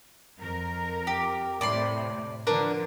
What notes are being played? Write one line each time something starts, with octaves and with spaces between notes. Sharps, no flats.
F2 A#4
G4
A2 C3 D5 B5 C6
D3 F3 D4 A#4 B4